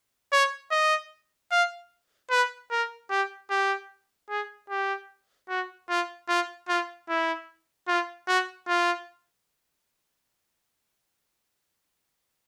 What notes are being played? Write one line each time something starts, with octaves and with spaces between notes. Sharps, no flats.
C#5
D#5
F5
B4
A#4
G4
G4
G#4
G4
F#4
F4
F4
F4
E4
F4
F#4
F4